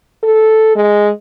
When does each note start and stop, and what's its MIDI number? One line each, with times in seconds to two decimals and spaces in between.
0.23 0.72 69
0.76 1.10 56